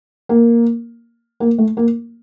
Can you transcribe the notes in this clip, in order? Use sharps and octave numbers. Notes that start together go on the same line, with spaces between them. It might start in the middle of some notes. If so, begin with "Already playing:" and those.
A#3
A#3
A3
A#3